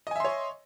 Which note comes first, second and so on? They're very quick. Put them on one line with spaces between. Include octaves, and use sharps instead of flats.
D#5 G#5 E5 C6 C#5